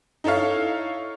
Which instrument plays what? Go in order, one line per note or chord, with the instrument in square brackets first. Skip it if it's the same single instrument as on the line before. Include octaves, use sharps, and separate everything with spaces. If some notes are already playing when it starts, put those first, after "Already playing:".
[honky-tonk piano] D#4 E4 A4 C#5 F5